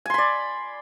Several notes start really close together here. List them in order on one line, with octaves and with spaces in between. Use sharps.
G#5 C6 B5 D5